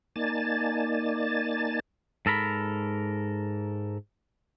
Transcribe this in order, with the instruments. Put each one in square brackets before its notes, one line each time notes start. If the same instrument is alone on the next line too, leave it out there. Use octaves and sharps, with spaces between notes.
[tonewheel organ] A#3 D#4 D5 G#5 A5 A6
[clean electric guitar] G#2 A4 A#4 B5